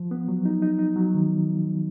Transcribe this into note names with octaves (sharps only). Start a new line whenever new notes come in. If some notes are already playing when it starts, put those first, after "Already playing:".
Already playing: F3
B3
F#3
D#4
D#4
D#4
F#3
D#3